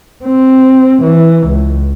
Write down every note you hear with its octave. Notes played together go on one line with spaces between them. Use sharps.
C4
E3
C#2